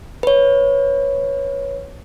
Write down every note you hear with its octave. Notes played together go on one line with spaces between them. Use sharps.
B4 C#5